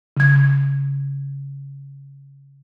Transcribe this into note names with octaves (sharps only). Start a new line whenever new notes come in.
C#3 G#6